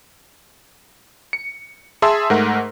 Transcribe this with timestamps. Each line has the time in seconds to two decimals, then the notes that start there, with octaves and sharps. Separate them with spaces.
1.33 C#7
2.02 G#4 E5 A5 C6 E6
2.30 G#2 A3 A#4 F#5